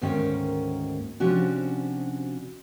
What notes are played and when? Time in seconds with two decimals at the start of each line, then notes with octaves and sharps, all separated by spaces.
0.01 D2 G#2 D#3 A#3 C#4 G5
1.20 C3 F3 C#4 D4 F#4